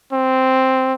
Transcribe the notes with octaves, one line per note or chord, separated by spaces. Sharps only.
C4